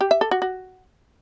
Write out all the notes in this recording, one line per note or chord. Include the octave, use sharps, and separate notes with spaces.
G4
E5
A4
F#4
F#4